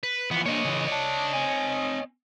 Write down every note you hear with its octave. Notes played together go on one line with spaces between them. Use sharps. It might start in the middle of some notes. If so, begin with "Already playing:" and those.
B4
E3 F3 B3
A#3 D4 C#5 D#5
C#3 E3
D5 A5
C4 G#5